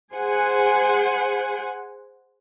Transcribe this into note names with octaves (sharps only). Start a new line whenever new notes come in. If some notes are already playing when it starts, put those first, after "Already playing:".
G#4 C5 F#5 G#5